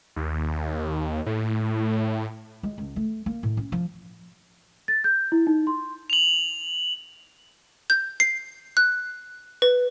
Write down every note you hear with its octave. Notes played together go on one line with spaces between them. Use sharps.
D#2
A2
G#3
C#2
A3
A#3
A2
C#4
F3
A6
G6
E4
D#4
C6
F7 F#7
G6
C7
F#6
B4